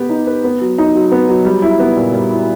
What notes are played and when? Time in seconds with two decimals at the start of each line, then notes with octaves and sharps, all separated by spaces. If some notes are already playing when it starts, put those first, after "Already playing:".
Already playing: B3 G4
0.10 D#4
0.27 B4
0.44 B3
0.61 F#3
0.78 D#4
0.95 F#3
1.12 B3
1.29 F#3
1.45 G3
1.62 E4
1.79 B3
1.97 A#2
2.13 G3
2.30 E4